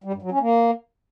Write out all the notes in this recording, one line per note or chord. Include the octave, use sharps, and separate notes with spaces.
G3
G2
F#3
C#4
A#3